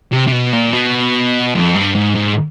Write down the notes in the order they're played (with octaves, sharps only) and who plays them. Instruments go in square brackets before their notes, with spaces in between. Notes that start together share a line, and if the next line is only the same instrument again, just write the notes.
[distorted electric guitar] C3
C3
B2
A#2
B2
F2
G2
G#2
G#2